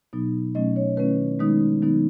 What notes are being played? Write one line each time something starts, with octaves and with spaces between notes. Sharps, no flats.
B2 F#3 B3 D#4
B2 F#3 A3 C#4 D#5
C#5
D#3 A3 C#4 E4 B4
D#3 G#3 B3 D#4 D#6
D#3 F#3 B3 D#4